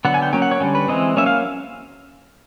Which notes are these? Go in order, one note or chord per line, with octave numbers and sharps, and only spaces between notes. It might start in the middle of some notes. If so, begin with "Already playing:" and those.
D3 F#3 B3 F#5
G#5
G5
F#3 A#3 C#4 G5
F#5
C#5
D3 G3 A#3 C#4
B4
E3 G#3 C4 D#5
F#3 A#3 C#4 E5
F5